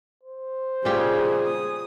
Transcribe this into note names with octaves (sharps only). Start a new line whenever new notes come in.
C5
A#2 C#3 G3 F4 G4 G#4
D#6